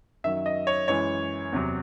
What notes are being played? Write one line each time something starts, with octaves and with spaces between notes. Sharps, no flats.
F#2 D#3 F#3 E5
D#5
C#5
F#2 E3 G#3 C#5
E2 C3 F#3